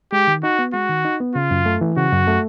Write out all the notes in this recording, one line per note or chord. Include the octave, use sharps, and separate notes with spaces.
G#3 G4
D#3
D#4 F#4
B3
G#3 F#4
D#3
D#4
B3
C#3 F4
F#2
A3
E3
C#3 F#4
F#2
A3